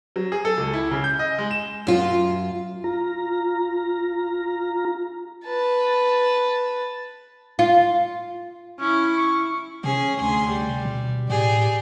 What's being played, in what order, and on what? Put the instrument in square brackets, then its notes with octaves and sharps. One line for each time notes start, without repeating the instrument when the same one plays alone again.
[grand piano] F#3
G#4
A4
C#2
E4
C#3
G6
D#5
G#3
E7
[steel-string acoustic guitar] F#2 F4
[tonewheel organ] F4 A#5
[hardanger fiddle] B4 A5
[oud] F4
[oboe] C#4 [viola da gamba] E4
[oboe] C#6
[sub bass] C3 [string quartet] C#4 G#4 C#5
[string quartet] D2 G#4 C6
G3
[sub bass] B2
[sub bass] A2 [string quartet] G4 G#4 D5